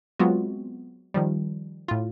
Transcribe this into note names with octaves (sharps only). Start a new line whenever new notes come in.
F#3 G#3 B3 C4 F4 F#4
D#3 F3 G3
A2 F4